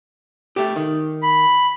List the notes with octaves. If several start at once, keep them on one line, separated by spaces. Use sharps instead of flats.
A3 G4
D#3
B5